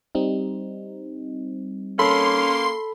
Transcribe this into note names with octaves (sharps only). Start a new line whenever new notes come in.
G3 C4 D#4
A#3 C#4 A4 B5 C6